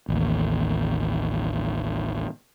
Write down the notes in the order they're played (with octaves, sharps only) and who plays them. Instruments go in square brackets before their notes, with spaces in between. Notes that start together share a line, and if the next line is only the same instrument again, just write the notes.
[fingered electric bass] A1 D#2